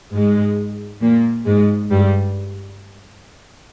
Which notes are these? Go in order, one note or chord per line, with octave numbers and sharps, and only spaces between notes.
G#2 G#3
A#2 A#3
G#2 G#3
G2 G3